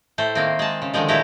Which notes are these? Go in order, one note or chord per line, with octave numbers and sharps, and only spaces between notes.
A2 A3 C5
D#3 A#3 C4
G#3 A5
C#3
D3 D#3 F3 G#3
A#2 A3 E4 G4 A#5